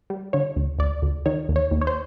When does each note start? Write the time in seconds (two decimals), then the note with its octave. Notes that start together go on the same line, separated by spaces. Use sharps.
0.10 G3
0.33 D3 C#5
0.56 D2
0.79 D2 D5
1.02 D2
1.26 D#3 C#5
1.49 D#2
1.56 C#5
1.71 D#2
1.81 C#5
1.87 C5